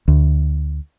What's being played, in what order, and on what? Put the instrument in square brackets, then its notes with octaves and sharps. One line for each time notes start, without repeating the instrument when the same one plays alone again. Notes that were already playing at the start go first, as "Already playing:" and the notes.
[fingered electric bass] D2